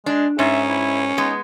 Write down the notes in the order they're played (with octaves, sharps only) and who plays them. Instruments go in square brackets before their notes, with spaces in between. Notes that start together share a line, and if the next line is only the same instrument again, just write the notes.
[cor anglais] G#3 [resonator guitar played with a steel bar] D4
[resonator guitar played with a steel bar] G#2 [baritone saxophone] C#4 [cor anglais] E5
[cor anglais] E4
[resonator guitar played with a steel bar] G#3 B3 [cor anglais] D#4